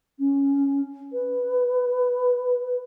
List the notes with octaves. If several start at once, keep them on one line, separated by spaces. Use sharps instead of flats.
C#4
B4